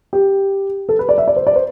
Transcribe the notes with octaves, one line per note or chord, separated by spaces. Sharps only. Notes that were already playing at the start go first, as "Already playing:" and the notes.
G4
A4
B4
D5
E5
D5
C5
D5
C5